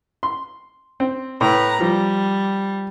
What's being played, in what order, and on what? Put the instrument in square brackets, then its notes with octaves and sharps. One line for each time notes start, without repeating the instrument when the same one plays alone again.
[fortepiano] C6
C4
[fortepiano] A2 [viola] B4 A#5
[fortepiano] F3 [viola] G3